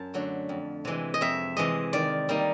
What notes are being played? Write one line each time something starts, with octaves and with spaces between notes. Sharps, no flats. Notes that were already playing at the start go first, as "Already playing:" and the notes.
Already playing: F#2 A5
D3 F#3 A3
F2
C3 E3 G#3
D#5
F2 E5
C3 E3 G#3 D#5
D#3 D5
G3 A#3 D#4